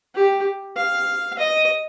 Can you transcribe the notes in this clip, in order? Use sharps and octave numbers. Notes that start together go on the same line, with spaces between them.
G4
F5
D#5